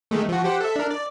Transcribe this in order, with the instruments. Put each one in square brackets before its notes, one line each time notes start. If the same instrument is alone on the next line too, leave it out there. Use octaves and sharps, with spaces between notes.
[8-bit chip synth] D#3 G#3 A3
F3 F#4
G4 C5 F#5
A4 E5
D4 A#4
D5